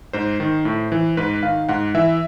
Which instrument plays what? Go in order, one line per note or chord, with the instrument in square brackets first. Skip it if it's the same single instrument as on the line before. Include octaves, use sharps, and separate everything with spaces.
[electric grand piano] G#2 C5
D#3
A2
E3
G#2 B4
D#3 F5
G#2 F#5
E3 E5